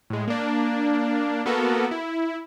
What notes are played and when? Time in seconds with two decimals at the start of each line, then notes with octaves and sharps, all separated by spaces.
0.10 A2 G#3
0.28 A#3 D4
1.45 A#3 B3 F#4 A4 A#4
1.91 E4